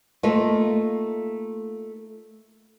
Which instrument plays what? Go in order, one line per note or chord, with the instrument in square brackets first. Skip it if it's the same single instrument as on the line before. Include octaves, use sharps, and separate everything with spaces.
[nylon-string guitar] A3 A#3 D#4 F4